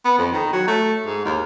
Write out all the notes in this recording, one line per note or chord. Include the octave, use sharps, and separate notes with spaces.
B3
F2
D#3
F#3
A3
G#2
D#2